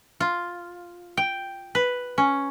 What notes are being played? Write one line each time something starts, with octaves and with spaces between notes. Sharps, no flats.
F4
G5
B4
C#4